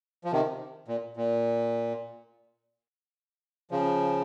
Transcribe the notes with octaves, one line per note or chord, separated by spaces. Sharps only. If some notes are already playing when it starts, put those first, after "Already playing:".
F3
C3 D#3
A#2
A#2
C#3 F3